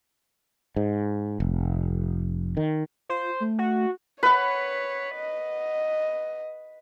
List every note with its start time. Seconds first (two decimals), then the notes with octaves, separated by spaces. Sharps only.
0.76 G#2
1.40 F1
2.57 D#3
3.09 F4 C5
3.40 A3
3.58 F#4
4.23 B4 C#5 F#5
5.15 D#5